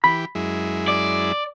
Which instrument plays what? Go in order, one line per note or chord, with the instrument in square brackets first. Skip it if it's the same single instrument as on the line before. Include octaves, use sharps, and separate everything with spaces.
[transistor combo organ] E3 G4 [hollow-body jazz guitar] B5
[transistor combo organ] F#2 G#3 E4
[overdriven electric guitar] D5